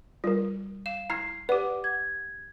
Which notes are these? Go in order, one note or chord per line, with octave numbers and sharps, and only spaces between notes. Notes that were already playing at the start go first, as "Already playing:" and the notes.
G3 F4 A#4
F5 E7
E4 A#5 F6 G#6 C7
G4 B4 D5 F#5 D6
G#6